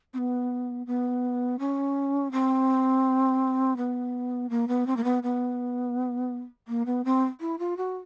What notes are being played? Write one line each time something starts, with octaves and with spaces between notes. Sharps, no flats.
C4
B3
B3
C#4
C4
B3
A#3
B3
C4
A#3
B3
B3
A#3
B3
C4
E4
F4
F#4